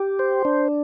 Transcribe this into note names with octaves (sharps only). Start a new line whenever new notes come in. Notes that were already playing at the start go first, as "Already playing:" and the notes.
Already playing: G4
C5
D4